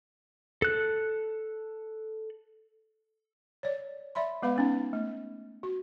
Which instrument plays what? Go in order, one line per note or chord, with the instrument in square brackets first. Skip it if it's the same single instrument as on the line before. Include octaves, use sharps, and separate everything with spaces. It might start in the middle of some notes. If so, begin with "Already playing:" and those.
[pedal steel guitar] A4 F#6
[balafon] C#5 D5
D5 E5 B5 C6
G#3 B3 B4 F5 B5
B3 C#4 D#4
A3
F#4